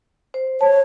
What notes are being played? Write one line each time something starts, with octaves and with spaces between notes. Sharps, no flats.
C5
C#5 A5